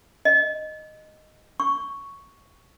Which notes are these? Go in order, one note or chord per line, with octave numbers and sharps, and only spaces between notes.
D#5
C#6